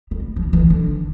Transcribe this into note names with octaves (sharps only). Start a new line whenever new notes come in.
G3
F3
E3
D3